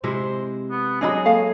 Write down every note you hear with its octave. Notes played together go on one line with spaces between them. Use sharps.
C3 G#3 E4 C5
B3
F#3 G#3 D4 G#4 A4 D#5 B5
A#3 A4 C#5 F5